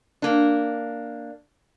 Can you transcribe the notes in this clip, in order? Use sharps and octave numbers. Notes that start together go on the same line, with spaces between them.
A#3 D4